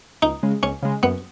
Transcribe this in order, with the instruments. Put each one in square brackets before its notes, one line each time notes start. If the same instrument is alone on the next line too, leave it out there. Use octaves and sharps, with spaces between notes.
[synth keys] C#2 [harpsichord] D#4
[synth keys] C#3 G#3
[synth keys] C#2 [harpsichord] C#4
[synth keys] C#3 G#3
[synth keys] F#2 [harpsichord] B3